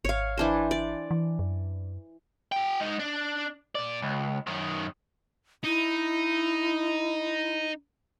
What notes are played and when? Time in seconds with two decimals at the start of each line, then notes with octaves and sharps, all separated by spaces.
0.05 G#1 C#5 F5
0.37 E3 D4 C5
0.71 D5
1.11 E3
1.39 F#2
2.52 F#4 G5
2.80 G#2 D#4
2.99 D4
3.75 A#2 D5
4.02 C#2
4.47 F#2 D#3
5.64 D#4 E4